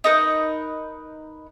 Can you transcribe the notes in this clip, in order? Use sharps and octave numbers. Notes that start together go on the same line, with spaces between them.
D#4 A#4 B4